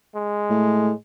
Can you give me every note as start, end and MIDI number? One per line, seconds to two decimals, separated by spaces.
0.15 0.94 56
0.50 0.91 45